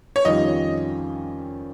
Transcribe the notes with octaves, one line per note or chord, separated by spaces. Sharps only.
C#5
F2 D#3 G3 C#4 F4 D#5